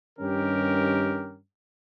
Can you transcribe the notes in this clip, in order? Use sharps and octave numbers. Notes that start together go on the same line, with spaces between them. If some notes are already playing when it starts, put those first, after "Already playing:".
G2 D#3 C#4 G4 A#4